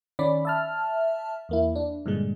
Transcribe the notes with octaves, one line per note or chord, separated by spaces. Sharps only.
D#3 C#4 D5 B5
E5 A5 F6
E2 A#3 E4
D4
G2 A#2 D3 G#3